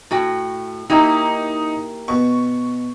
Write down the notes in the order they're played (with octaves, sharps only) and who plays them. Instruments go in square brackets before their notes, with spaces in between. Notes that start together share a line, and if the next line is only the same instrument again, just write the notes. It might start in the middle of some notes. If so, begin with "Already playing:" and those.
[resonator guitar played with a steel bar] A2 F#4 G5
[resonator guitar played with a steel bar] A#3 E4 G4 [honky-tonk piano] D#4
[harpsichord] B2 [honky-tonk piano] C#6